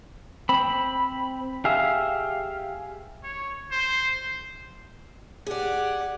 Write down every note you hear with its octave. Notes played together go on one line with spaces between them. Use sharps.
C4 B5
G4 G#4 E5 F5
C#5
C5
G4 G#4 D5 F#5